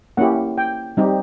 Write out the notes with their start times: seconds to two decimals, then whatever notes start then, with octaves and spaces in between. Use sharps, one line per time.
0.17 A#3 C#4 E4 G4 F#5
0.58 G5
0.97 G3 C4 D#4 G4